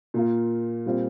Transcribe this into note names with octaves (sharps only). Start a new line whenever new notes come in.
A#2 A#3 F4
A#2 G3 C4 F4